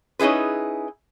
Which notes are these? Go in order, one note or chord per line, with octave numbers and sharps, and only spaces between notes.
C#4 D#4 E4 G#4 B4